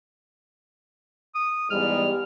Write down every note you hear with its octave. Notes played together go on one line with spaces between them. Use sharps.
D#6
E2 G#2 G3 F6